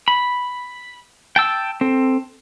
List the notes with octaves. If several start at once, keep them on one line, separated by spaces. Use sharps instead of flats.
B5
G5 A5 E6
C4 A4